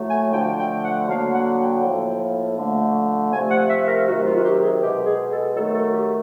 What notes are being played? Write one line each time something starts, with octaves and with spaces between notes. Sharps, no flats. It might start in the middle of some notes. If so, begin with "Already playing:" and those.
Already playing: A2 F#3 A3
G#5
D3 F3 A3 G5
G5
F#5
D3 F#3 A#3 F5
F#5
G5
A2 F3 A#3
D3 F3 A3
C3 F3 A3 G#5
F#5
E5
A#4
C3 D#3 F#3 F#4
F4
F#4
G4
G#4
B2 G#3 G4
G#4
A4
D#3 F#3 A3 A4
A4
G4